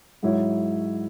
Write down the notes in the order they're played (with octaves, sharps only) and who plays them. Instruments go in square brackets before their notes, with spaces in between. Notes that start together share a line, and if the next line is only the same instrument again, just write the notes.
[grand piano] G#2 F#3 E4 C#5